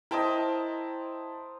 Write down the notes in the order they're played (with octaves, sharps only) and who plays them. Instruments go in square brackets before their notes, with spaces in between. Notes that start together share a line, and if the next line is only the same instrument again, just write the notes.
[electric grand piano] E4 G5 A5 [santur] A#4 C5 D#5